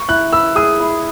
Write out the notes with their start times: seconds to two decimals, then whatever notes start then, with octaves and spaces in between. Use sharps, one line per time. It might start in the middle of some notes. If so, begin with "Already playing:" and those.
Already playing: C#6
0.08 E4 F#6
0.33 B4 E6
0.55 G#4 D#6
0.80 E4